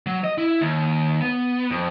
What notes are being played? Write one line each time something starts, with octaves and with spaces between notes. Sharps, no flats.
F#3
D#5
E4
D#2
B3
F2